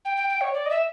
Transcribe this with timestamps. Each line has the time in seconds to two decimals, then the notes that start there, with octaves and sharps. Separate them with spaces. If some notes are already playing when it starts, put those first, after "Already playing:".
0.05 G5
0.17 G5
0.30 G5
0.41 C#5
0.54 D5
0.66 D#5
0.70 E5